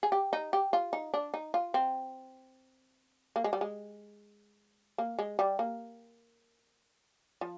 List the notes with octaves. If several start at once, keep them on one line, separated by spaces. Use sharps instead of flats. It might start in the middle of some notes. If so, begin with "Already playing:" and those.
G#4
G4
D#4
G4
F4
D#4
D4
D#4
F4
C4
A#3
G#3
G3
G#3
A#3
G#3
G3
A#3
F3